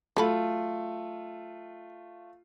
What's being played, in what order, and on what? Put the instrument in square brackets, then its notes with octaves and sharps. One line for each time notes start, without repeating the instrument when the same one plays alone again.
[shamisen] F#3 A4 B5 [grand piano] A3 F4